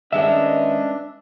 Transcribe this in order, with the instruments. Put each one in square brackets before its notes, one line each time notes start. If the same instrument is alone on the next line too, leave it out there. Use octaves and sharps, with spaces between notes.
[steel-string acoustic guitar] D#3 G#3 C#4 [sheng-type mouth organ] D4 [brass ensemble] B4 D#5 [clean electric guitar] E5